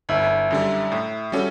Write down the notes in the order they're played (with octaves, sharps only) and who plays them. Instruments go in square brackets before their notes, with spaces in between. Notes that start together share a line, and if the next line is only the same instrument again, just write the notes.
[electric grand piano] G1 [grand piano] E4
[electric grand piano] F#2 D3 G3
A2
G3 C#4 F#4 A4